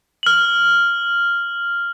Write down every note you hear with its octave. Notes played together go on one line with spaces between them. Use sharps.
F6 F#7